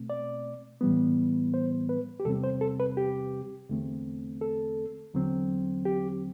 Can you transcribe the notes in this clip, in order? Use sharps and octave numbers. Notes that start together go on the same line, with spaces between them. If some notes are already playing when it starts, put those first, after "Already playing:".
Already playing: B2 A3 C4
D5
A2 E3 G3 B3
C5
B4
G4
E2 C3 G3 C4 A4
C5
A4
B4
G4
E2 D3 A3 C4
A4
E2 D3 F#3 C4
G4